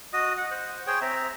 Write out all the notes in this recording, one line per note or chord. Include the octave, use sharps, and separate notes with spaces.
F#4 D#5 D#6
F#5
C5 F#5
G#4 C5 C#5 G5
C4 E5 A#5